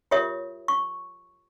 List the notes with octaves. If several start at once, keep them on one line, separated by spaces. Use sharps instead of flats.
F4 G4 A#4 C#5 E5 D#6
C#6